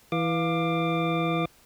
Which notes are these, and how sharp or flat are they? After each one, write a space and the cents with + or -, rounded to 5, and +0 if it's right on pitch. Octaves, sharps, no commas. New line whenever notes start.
E3 +0 F5 +0 D6 +20